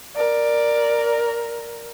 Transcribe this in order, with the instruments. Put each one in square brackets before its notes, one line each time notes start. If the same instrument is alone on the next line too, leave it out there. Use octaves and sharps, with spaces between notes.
[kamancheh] A#4 [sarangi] D5